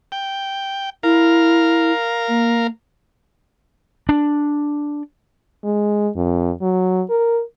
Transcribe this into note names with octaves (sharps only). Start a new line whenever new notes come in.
G5
E4 A#4 F5
A#3
D4
G#3
F2
F#3
A#4